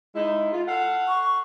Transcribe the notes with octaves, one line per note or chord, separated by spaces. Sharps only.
G#3 D#4 E4
F4
A4 F5 F#5
C#6